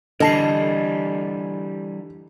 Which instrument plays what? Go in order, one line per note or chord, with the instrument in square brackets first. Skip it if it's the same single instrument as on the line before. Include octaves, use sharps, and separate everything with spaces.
[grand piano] D3 [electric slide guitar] E3 G3 [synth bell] A4 A5 C7 [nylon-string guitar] D#5